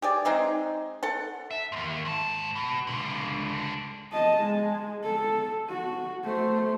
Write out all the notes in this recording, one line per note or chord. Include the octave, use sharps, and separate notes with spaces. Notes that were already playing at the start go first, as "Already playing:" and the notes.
G4 G#4 D5
G#3 C4 D#4 G#4
A4 F#5 A5
E5
D#2 G#2
G#2 A5
B2
C#2 D3
D#5 A5
G#3
A4
F#4
A3 C5